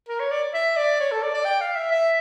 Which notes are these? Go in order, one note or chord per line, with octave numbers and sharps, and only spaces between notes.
A#4
C#5
D5
E5
D5
C#5
A4
D5
D5
G5
F5
E5
E5